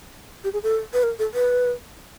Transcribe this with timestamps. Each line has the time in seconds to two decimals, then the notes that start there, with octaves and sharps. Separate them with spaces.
0.44 G4
0.53 G#4
0.63 A4
0.93 B4
1.03 A#4
1.19 A4
1.34 B4